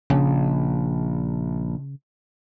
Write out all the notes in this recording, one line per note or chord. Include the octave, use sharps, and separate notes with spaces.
A#1 C#3